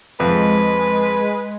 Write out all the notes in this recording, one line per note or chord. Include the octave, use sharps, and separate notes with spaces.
F2 G#3 B4